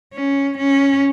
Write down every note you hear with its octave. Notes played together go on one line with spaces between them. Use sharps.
C#4
C#4